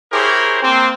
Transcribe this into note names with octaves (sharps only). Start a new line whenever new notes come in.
E4 G4 G#4 A#4 C5 C#5
A#3 C4